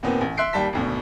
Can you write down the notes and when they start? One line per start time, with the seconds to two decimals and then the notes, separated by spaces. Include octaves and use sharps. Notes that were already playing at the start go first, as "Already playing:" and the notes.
0.03 D#2 A#2 B3 C4
0.21 A1
0.37 E5 C6 F#6 C7 D7
0.53 D#2 G3 G5 A5 B6
0.73 G#1 D2 B2